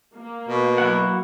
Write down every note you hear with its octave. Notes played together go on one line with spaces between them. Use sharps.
A#3
B2
F#3 E4 F#5